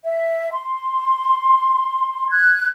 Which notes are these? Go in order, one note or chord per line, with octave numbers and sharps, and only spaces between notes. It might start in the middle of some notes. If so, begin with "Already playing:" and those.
E5
C6
F#6 G#6